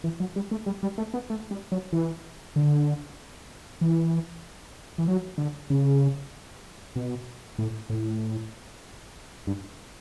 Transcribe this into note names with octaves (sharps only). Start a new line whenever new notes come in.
E3
F#3
G3
A3
G3
G3
A3
B3
A3
G3
F#3
E3
D3
E3
E3
F#3
D3
C#3
B2
A2
A2
G2